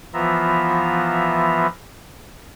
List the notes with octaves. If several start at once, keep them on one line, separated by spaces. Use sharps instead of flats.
E3 F3 B3 F4 E5 A#5